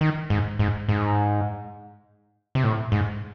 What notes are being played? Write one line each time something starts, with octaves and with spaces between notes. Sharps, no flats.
D#3
G#2
G#2
G#2
C3
A2
G#2